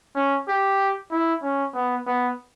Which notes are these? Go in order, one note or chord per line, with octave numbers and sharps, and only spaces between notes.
C#4
G4
E4
C#4
B3
B3